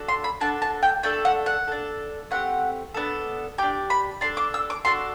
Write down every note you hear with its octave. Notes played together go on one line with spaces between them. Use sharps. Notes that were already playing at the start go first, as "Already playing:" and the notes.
Already playing: D4 F#4 A4
C6
B5
D4 F#4 A4 A5
A5
G5
A3 D4 A4 G5
F#5
F#5
D4 A4
A3 C4 G4 F#5
B3 D4 A4
D4 G4 G5
B5
D4 A4 C6
D6
E6
D6
D4 F#4 A4 C6